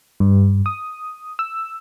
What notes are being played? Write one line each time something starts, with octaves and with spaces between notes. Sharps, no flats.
G2
D#6
E6